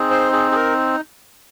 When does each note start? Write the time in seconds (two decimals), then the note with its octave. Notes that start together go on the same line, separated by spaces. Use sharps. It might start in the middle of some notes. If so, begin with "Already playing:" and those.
Already playing: C4 D#4 G#4
0.11 C5
0.33 G#4
0.51 G#4
0.56 A#4